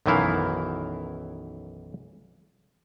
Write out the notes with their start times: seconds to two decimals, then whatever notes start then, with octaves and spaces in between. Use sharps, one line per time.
0.06 B1 F#2 D#3 E3 E4 F5